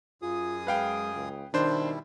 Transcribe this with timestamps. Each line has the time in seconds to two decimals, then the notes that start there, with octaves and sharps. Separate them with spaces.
0.22 F#2 F4 G#4 D#6
0.67 G#3 B4 F5 G5
1.14 C#2
1.54 B2 D#3 G3 D4 E4 C5